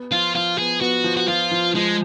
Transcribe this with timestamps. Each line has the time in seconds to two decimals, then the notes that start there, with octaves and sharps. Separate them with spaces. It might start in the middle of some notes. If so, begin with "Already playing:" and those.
Already playing: B3
0.12 F3 F4
0.35 F3 F4
0.58 B3 G#4
0.81 B3 F#4
1.04 F3
1.17 F#4
1.28 F3 F4
1.51 F3
1.75 F3 G#3